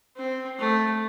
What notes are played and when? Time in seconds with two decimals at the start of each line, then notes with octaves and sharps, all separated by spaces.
0.16 C4
0.59 A3